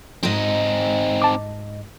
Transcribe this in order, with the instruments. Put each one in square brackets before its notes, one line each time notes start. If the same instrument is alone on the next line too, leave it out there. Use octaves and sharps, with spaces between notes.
[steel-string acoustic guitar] G#2 D#5 [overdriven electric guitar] C4 D#4
[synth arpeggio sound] A5 D6